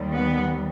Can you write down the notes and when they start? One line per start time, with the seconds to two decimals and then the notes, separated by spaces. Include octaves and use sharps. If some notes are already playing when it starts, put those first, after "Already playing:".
Already playing: D#2 D#3 G3
0.12 B3